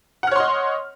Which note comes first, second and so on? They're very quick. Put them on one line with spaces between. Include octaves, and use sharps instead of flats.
F#5 F6 C#5 C6 D#5